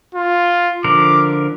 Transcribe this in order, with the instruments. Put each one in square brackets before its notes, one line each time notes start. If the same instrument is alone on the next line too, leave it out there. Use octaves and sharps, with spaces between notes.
[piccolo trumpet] F4
[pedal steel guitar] D3 F3 A#4 [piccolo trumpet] D6